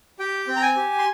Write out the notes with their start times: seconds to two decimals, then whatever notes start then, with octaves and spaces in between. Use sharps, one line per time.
0.20 G4 G5
0.48 C4
0.56 A#5
0.62 G#5
0.76 G4
0.99 C6